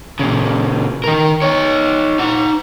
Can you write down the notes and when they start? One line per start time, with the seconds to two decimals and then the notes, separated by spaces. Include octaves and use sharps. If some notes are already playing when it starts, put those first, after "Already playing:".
0.19 A#2 C#3
1.04 D#3 A#4
1.42 D#4 C#5
2.20 D#4 F#5